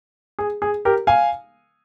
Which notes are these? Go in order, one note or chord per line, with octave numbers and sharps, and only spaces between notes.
G#4
G#4
G4 A#4
F5 G#5